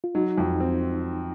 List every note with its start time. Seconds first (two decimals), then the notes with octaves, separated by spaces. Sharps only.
0.04 F4
0.15 F#3 D#4
0.38 F2
0.60 C4